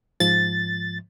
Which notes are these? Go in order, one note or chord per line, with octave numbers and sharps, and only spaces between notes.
G#2 F3 A6